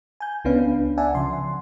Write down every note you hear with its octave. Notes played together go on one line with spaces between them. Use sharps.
G#5 G6
C#2 B3 C#4 D4 B4 F5
D5 E5 F#5 G#5 A5
C#3 F3 C6